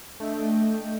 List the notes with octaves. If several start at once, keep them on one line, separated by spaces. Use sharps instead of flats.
A3 D4 D#5 G5